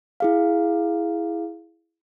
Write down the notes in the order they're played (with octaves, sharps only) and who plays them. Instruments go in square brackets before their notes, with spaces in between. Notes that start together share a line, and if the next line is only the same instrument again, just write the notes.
[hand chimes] E4 G#4 F5